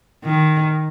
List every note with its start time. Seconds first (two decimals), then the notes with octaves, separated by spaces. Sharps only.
0.24 D#3